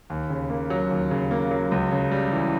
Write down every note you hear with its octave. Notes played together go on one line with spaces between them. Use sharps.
D#2
C#3
A#3
F#3
D#2
C#3
A#3
F#3
C#2
C#3
G3
E3